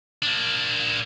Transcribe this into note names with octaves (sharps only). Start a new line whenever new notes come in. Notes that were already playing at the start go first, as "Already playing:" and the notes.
A#3 D4